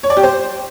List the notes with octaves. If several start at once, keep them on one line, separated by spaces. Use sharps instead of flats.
C#5
D5
G4
C5